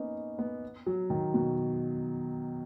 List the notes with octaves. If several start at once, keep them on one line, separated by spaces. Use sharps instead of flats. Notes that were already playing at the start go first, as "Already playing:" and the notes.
Already playing: A#3 B3 C#4 D#4
B3
F#3
D#3
B2